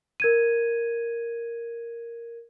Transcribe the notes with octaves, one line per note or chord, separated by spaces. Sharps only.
A#4 G#6 D#7